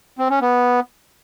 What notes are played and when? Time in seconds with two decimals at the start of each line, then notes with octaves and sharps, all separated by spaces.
0.18 C4
0.30 C#4
0.41 B3